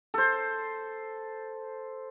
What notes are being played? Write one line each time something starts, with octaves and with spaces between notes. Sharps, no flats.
A4 C5